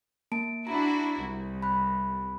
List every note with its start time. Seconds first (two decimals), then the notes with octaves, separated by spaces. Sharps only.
0.32 A#3 A5 D7
0.67 D4 E4 F#4 A#5
1.19 C2
1.62 B5 F#6